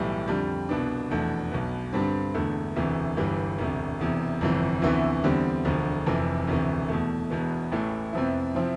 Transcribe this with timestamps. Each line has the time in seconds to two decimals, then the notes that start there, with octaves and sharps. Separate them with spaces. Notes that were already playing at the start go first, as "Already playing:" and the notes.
Already playing: B1 A2 E3 G3
0.28 F2 D3 G3
0.69 C2 B2 B3 D4
1.10 F1 E2 B2 A3 D4
1.51 B1 B2 B3
1.93 G2 D3 G3 C4
2.34 E1 E2 D3 A3
2.76 E1 D2 C3 E3
3.17 G1 G2 E3 G3
3.58 E1 D2 C3
4.00 E1 E2 C3
4.41 G1 F2 C3 E3
4.82 D2 C3 E3 B3 E4
5.24 E2 D3 G3 C4
5.65 E1 D2 D3 F3
6.06 F1 F2 C3 E3
6.47 E1 D2 C3 E3
6.89 E2 B2 A3
7.30 E1 E2 B2 B3
7.72 A1 A2 E3 A3
8.13 F2 C3 F3 B3 E4
8.55 C3 F3 C4 E4